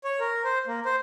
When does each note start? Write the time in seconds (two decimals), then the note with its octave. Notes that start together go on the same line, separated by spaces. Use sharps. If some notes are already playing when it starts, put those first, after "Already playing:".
0.04 C#5
0.20 A#4
0.45 C5
0.67 A#3
0.85 C5